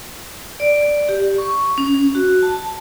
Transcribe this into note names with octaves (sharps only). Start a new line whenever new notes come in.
D5
G4
C#6
C#4
F#4
A5